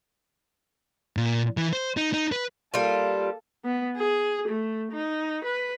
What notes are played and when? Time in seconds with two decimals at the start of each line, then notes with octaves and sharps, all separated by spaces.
1.17 A#2
1.57 E3
1.73 C5
1.97 D#4
2.13 D#4
2.32 B4
2.74 G3 A#3 F4 A4
3.65 B3
3.97 G#4
4.48 A3
4.93 D#4
5.44 B4